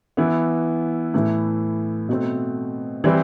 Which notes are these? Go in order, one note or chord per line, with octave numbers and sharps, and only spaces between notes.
E3 B3 E4
A2 E3 A3 E4
B2 A3 C4
E3 G3 C4 E4